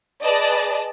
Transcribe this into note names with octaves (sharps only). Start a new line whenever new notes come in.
G#4 B4 D5 D#5 A5